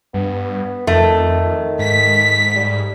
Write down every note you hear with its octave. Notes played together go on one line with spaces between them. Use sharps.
G2 B3
F2 D#3 A3
G#2 B6
G3